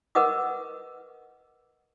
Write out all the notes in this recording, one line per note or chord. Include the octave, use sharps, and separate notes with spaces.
A#4 B4 D#5 F#5 D6 D#6